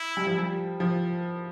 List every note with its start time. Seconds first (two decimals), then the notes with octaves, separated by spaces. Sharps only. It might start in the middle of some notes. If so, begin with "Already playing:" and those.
Already playing: E4
0.17 G3
0.27 F3
0.38 G3
0.80 F3